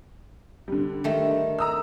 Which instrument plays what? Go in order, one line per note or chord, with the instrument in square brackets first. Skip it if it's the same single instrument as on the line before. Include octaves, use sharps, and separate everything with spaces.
[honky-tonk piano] D3 G3
[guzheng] D#3 A3
[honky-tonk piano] A#5 D#6 E6